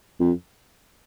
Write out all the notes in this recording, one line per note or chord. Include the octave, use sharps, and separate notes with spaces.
F2